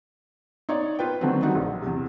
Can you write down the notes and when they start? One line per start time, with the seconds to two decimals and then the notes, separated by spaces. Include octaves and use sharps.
0.69 D#4 C#5 D5
0.99 F4 B4 G5
1.21 D3 D#3 F#3 A3 B3 C4
1.42 G3 C4 D#4 F#4
1.55 A#1
1.82 E2 C3